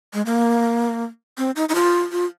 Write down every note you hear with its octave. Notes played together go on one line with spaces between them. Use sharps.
G#3
A#3
C4
D#4
D#4
F4
F4